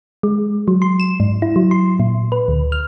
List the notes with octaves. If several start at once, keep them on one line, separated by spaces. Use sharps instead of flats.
G#3
F#3
C6
E7
G#2
E4
F#3
C6
A#2
B4
D2
F6